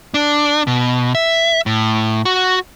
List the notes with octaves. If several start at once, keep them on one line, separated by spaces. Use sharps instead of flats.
D4
B2
E5
A2
F#4